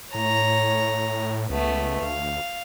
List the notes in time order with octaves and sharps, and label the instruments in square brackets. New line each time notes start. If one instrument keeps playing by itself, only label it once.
[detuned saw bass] A2 [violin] C#5 A#5
[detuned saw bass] C#2 [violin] A3 B3
[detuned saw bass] D2 [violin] F5